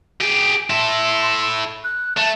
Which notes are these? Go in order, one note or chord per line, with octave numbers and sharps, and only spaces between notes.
G4 G#4 D7
E4 A4 C6
F#6
A3 A5